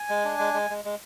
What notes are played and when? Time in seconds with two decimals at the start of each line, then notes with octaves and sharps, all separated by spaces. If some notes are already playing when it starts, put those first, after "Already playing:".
Already playing: G#5
0.09 G#3
0.25 D4
0.39 G#3
0.54 G#3
0.70 G#3
0.85 G#3